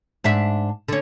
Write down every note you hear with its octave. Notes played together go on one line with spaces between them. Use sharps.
G#2 D4 E5
D3 C#4